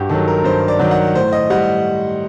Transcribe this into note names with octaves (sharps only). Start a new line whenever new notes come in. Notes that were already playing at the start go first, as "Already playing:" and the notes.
Already playing: G2 F#4 G4
D#3 F#3 A4
A#4
G2 C5
D5
D#3 F#3
F#5
A2 C5
D#5
G3 F#5